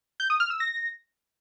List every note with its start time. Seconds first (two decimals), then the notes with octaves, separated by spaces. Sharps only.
0.20 G6
0.30 D#6
0.40 F6
0.50 E6
0.60 A#6